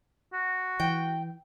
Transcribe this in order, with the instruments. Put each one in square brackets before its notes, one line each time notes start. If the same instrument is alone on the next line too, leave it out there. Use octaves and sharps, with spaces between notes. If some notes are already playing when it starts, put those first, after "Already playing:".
[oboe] F#4
[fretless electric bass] E3 [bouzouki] G5